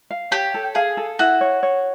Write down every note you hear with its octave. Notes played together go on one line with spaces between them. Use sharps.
F5
G4 C#5
A4
G#4 F5
A4
E4 F#4
C#5
C#5